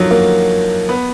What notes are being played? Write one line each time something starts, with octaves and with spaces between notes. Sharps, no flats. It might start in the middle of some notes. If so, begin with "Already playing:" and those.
Already playing: D3 D#3 F3 F#3
A#3
B3